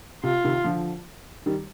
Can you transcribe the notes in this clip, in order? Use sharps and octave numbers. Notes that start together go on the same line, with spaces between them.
C3 F4
C3 D#3
D3 F3
D#3 G3